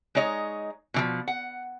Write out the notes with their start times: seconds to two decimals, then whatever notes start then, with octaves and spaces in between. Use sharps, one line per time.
0.15 G#3 D#4 C#5 D#5
0.94 B2 E3 F3
1.28 F#5